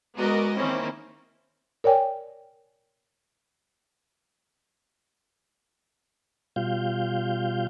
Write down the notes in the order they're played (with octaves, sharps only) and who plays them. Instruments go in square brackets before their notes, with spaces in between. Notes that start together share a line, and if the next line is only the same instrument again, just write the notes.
[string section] G#3 B3 F#4 A#4 D5 D#5
D#3 A#3 C4 C#4 E4
[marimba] A#4 C#5 D5 G5 G#5
[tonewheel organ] B2 G3 F4 F5 G6